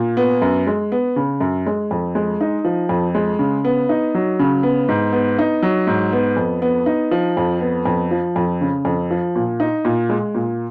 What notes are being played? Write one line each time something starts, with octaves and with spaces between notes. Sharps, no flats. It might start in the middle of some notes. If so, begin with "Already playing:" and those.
Already playing: A#2
B3
F#2
G#3
B3
C#3
F#2
G#3
F2
G#3
D#4
F3
F2
G#3
C#3
B3
D#4
F#3
C#3
B3
G#2
B3
D#4
F#3
G#2
B3
F2
B3
D#4
F3
F2
B3
F2
F3
F2
C#3
F2
F3
A#2
D#4
A#2
G#3
A#2